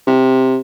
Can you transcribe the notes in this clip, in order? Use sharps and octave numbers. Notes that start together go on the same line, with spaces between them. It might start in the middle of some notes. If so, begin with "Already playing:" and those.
C3